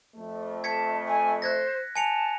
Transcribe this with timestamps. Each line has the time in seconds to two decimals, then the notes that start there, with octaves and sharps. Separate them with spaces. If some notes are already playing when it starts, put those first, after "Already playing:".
0.16 F2 A3
0.64 A5 G#6 B6 C#7
1.07 G#5
1.42 C5 F#6 G#6 A#6
1.96 G#5 A5 C#7 F7